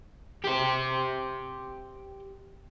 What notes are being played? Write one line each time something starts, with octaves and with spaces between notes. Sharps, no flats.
G4 C5